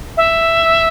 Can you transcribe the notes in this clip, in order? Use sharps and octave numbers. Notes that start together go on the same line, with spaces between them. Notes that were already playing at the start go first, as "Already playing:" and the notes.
E5